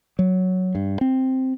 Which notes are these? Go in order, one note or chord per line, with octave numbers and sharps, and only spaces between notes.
F#3
G2
C4